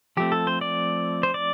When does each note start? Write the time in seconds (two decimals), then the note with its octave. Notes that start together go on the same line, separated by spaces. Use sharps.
0.17 F3 A3 C4 G4
0.32 A4
0.47 C5
0.61 D5
1.23 C5
1.34 D5